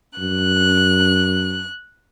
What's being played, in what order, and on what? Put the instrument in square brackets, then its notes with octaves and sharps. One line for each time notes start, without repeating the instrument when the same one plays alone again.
[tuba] F#2 [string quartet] F#6